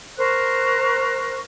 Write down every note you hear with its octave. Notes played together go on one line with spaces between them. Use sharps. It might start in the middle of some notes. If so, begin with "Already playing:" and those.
A#4 C5 C#6 F#6